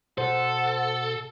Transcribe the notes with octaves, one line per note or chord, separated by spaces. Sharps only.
B2 A4 C5 F#5